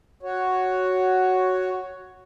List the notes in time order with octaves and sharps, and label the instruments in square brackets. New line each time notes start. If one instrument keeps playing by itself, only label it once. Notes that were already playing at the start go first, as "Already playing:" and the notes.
[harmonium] F#4 C#5